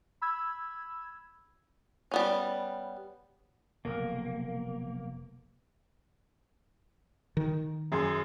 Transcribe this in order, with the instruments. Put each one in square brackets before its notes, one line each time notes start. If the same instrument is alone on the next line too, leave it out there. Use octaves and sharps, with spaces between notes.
[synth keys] B5 E6 G#6
[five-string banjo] G3 B3 C#4
[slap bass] F1 C#3 [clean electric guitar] B1 [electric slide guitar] A#3
[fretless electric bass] D#3
[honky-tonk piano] F#2 G#4 C6